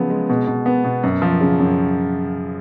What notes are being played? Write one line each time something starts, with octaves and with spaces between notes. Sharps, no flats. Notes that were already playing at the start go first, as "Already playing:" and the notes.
Already playing: C#3 F3 F#3 B3
G#3
B2
B2
B3
B2
F#2
F3
C#3
F#2